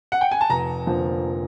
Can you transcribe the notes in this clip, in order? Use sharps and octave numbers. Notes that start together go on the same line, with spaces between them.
F#5
G5
G#5
A5
F1 A#5
F2 D3 F3 A#3